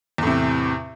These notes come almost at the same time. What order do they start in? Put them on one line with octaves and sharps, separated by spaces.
E2 A2 C3